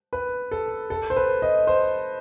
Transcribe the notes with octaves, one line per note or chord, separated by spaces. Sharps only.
B4
A4
A4
C5
B4
D#5
C5